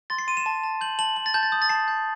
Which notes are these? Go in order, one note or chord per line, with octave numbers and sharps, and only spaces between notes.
C6 A6
C7
C6 D#7
E7
A5
A5
G6 F#7
A5 F#7
A5 F#7
A6
A5 G6
A6
D#6 G6
A6
A5 C7
G6